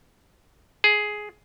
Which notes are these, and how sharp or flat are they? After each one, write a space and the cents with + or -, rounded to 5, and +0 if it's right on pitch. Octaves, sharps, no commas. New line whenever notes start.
G#4 +10